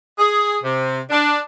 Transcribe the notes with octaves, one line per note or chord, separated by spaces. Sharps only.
G#4
C3
D4